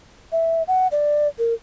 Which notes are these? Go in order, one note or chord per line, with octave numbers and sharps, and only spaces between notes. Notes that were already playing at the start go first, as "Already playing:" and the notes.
E5
F#5
D5
A#4